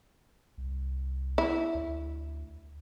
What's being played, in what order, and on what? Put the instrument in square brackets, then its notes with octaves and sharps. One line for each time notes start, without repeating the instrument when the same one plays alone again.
[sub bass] C2
[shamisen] E4
[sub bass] D2